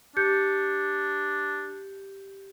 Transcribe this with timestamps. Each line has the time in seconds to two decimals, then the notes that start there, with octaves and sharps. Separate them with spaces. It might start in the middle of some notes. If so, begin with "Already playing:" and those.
0.17 D4 G4 G6 C#7